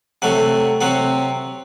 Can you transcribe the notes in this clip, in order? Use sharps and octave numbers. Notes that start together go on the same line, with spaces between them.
C3 F#3 A3 F#5
C3 F#3 C4 F#5